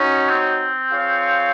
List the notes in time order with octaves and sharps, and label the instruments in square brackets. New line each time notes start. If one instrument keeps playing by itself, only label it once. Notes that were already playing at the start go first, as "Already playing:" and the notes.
Already playing: [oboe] C#4 [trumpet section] D#4 F#4 C#5
[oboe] C4
[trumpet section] F4 G#4 C#5 F5